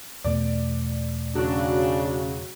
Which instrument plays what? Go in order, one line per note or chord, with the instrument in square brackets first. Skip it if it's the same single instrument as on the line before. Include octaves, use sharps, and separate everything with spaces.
[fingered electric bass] E2 B2 A3 [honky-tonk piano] D5
[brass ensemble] C#3 [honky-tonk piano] F#3 F#4 [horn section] D4